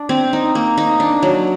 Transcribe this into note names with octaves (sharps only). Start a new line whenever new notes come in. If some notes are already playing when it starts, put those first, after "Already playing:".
Already playing: D4
C4
D#4
A#3
D#4
D4
F#3